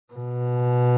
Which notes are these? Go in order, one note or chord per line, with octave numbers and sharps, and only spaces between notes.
B2